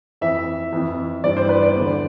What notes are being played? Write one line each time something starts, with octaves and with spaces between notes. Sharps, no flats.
F2 E3 E5
F2 E3
G2 E3 D5
C5
B4
D5
E2 D3